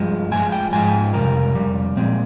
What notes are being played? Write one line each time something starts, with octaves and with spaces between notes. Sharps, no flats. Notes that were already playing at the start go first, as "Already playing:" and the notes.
Already playing: G2 F3 G#3
G#2 F3 G#3 G#5
G5
G#2 F3 G#3 G#5
F2 C3 G3 A#4
F2 C3 G3
A#2 G#3 C4